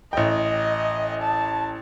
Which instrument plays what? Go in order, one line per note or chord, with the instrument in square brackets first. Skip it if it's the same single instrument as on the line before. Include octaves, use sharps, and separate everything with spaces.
[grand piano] A1 G5 [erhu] D#5
[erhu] A5